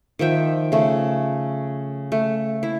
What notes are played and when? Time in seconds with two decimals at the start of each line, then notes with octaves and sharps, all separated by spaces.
0.19 D#3 F3 E5 G5
0.72 C#3 A3
2.12 A3
2.63 E4